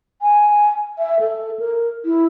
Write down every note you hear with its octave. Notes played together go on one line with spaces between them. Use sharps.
G#5
E5
A4
A#4
E4